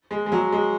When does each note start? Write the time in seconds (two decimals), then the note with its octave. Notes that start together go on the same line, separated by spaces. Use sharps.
0.11 G#3
0.26 G#3
0.32 F#3
0.52 G#3